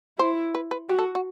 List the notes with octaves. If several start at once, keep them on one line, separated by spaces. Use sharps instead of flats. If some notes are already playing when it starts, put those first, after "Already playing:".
E4 C5
B4
B4
F#4 G4
A4
F#4